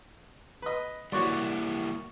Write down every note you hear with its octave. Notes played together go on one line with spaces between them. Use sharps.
B4 D#5
G3 A#3 E4 F#4 C#5 D5